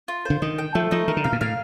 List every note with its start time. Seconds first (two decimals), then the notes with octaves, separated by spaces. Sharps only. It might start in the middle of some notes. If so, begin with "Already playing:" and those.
0.08 F4
0.25 D3 C5
0.42 D#3 D#5
0.58 G5
0.75 F3 A3
0.91 F3 D#4
1.08 D#3 A#4
1.17 D3
1.24 C3 F5
1.32 A#2
1.41 A2 F5